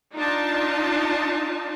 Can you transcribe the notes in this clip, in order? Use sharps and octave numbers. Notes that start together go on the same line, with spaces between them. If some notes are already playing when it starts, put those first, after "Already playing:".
D4 D#4 F4 A5